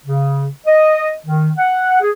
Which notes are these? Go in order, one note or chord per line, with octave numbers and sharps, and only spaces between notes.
C#3
D#5
D#3
F#5
G#4